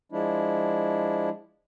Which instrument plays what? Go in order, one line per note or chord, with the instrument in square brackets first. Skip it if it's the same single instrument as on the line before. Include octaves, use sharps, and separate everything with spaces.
[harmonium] F3 G#3 D4 E4